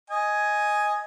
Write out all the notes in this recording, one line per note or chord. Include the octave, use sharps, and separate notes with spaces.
D#5 G#5